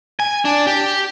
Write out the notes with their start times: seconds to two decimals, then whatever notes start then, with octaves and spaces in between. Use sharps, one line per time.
0.20 G#5
0.45 D4
0.67 G4